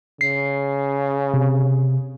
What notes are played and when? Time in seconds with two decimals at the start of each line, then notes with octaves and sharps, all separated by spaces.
0.21 C#3 C7
1.34 C3